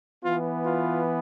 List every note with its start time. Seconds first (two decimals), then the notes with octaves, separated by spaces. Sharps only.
0.24 E3 B3 F4
0.64 F4